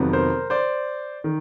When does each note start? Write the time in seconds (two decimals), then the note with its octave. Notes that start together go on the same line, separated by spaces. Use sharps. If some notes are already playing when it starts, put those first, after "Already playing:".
Already playing: F2 C3 D#3 F#3 B3
0.13 A#4 C5
0.50 C5 D5
1.24 D#3